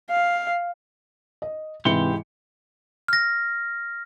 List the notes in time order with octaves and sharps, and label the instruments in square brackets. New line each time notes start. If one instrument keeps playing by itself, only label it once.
[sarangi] F5
[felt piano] D#5
[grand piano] G#2 E4 C#7 [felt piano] C3 E3 [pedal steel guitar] G4 C6
[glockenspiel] F6 A#6